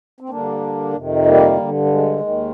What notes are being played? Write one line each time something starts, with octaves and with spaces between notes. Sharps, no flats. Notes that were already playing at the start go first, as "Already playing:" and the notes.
C4
G2 D3 A#3 D4
F2 C3 D#3
G3 A#3
G2 D3
G3
G#3
D#2 D#3